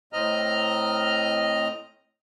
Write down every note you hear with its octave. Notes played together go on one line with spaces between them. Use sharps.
A2 C4 D#5 A#5 F6